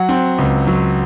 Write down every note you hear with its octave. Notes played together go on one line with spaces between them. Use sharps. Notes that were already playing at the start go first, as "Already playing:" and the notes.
Already playing: F#3 F#5
C4
C#2
F#3